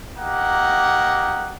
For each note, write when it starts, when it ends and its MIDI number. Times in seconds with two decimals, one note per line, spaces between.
0.18 1.57 58
0.18 1.57 63
0.18 1.57 67
0.18 1.57 78